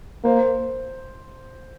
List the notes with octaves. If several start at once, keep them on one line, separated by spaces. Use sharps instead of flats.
A#3 C5